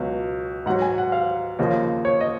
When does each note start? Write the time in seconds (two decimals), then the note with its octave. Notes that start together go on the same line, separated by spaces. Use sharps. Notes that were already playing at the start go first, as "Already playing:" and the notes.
Already playing: C#2 B2 F#3
0.66 G#2 F#3 F#5
0.82 G#5
0.98 F#5
1.12 F5
1.59 D#2 C#3 F3 D#5
2.05 C#5
2.21 D#5